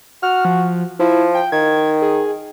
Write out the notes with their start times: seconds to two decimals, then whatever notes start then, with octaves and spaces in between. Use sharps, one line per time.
0.23 F#4 F6
0.45 F3
0.99 F3 E4
1.35 G5
1.52 D#3 G#6
2.02 G#4